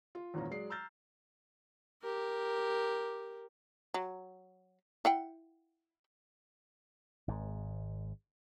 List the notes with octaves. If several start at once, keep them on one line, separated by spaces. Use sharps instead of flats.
F4
G#1 E2 A#2 C#4 A#5
F#3 G#3 D5 C7
A#5 E6 F6 G6 A6
G4 A#4
F#3
E4 F#5 G5
G#1 G#2